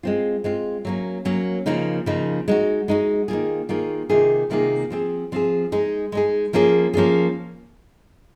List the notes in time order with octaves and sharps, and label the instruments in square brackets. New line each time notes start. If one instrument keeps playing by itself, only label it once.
[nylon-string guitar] G#3 C4 F4
G#3 C4 F4
F#3 A#3 C#4
F#3 A#3 C#4
C#3 F3 A#3 D#4
C#3 F3 A#3 D#4
G#3 D#4 F#4
G#3 D#4 F#4
D#3 A#3 F4 G#4
D#3 A#3 F4 G#4
C3 D#3 A#3 F4 G#4
C3 D#3 A#3 F4 G#4
F3 C4 F4 G#4
F3 C4 F4 G#4
G#3 D#4 G#4
G#3 D#4 G#4
F3 A#3 C#4 F4 G#4
F3 A#3 C#4 F4 G#4